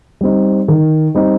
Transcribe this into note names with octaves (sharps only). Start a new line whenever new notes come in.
G3 C4 D#4
D#3
G3 C4 D#4